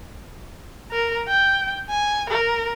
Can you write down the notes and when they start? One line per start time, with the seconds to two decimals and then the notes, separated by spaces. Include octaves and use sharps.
0.91 A#4
1.28 G5
1.89 G#5
2.29 A#4